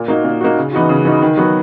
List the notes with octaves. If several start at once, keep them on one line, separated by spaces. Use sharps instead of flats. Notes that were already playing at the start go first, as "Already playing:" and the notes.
Already playing: A#2
A#3 D#4 F#4
A#2
A#3 D#4 F#4
C#3
E3 B3 D#4 F#4
C#3
E3 B3 D#4 F#4
D#3
F#3 B3 F#4